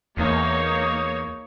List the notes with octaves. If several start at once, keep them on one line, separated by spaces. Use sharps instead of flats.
E2 A#3 D#4 C#5